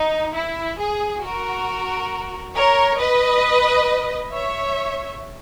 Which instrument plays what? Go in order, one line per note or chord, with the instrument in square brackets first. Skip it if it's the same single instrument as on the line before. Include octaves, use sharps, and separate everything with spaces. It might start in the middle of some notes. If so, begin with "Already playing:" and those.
Already playing: [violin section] D#4
E4
G#4
F#4 A#4
A#4 C#5
B4 D#5
C#5 E5